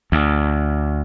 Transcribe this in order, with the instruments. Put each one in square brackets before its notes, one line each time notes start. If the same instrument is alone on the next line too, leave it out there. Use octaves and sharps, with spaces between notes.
[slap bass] D2